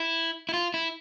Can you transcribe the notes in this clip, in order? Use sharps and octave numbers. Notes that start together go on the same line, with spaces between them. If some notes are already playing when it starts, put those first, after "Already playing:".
Already playing: E4
E4
F4
E4